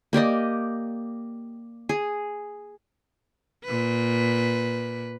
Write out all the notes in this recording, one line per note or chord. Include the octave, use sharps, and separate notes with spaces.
A#3 G4 D5 D#5
G#4
A#2 B4